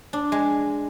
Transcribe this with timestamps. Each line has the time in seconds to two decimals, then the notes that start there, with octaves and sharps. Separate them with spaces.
0.13 D4
0.32 G#3